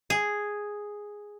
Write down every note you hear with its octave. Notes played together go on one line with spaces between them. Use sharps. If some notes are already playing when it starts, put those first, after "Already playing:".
G#4